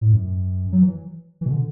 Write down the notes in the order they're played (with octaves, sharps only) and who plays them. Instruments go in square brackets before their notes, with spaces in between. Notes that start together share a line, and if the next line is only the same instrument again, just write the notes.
[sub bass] A2
F#2
F#3
E3
E3
B2
D3